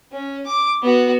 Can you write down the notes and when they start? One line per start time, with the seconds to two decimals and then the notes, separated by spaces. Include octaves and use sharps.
0.12 C#4
0.46 D6
0.82 B3 F#4